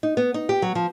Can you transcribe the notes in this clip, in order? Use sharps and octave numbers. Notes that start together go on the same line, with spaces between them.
D#4
B3
D#4
G4
F#3
F3